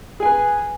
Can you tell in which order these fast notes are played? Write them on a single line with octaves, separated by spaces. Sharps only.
G#4 G#5 B4